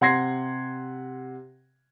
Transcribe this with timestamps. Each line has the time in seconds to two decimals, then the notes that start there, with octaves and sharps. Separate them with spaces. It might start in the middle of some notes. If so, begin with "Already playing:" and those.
0.01 C3 F#5 C6 G#6 A#6 C7